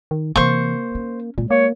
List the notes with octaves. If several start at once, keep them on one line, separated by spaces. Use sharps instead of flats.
D#3
C3 E3 A#3 C5 C#6
C#4
A#2 G#3
A#3 C#5